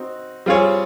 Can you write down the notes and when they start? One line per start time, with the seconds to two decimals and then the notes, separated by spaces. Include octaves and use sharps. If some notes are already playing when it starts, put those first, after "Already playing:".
Already playing: C4 D#4 F#4
0.46 G3 C4 F4 G#4 C#5